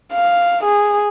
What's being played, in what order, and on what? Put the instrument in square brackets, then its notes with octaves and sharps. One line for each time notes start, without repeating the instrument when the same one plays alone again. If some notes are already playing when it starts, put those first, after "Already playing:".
[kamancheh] F5
G#4